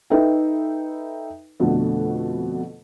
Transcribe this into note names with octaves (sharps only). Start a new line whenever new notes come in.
D#4 A4 B4 E5 G5
F2 B2 D3 A3